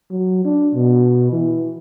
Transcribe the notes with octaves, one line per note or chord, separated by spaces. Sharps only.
F#3
D4
B2
E3